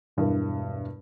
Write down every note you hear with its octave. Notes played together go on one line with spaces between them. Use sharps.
E1 G2 E4 A#4